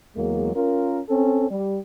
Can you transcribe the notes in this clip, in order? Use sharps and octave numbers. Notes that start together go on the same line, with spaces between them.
E2 F#3 G#3 A#3
C#4 F4 A#4
C4 C#4 A4
G3